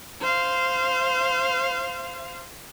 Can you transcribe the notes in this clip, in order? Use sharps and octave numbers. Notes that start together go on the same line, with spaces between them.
C5 F5